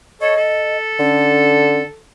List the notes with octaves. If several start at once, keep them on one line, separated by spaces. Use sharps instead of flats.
A4 C#5 D#5
A4
D3 C#4